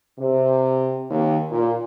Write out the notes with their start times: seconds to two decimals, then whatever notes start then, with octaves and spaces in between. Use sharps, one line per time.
0.20 C3
1.10 D#2
1.51 A#2